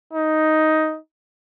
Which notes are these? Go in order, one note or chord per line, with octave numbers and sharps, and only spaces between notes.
D#4